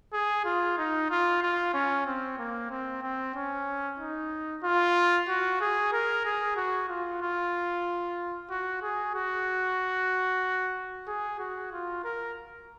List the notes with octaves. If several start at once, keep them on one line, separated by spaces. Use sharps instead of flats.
G#4
F4
D#4
F4
F4
C#4
C4
A#3
C4
C4
C#4
D#4
F4
F#4
G#4
A#4
G#4
F#4
F4
F4
F#4
G#4
F#4
G#4
F#4
F4
A#4